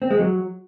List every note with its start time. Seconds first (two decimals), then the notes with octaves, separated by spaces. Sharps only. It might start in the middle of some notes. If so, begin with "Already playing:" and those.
0.02 C4
0.11 G#3
0.19 F#3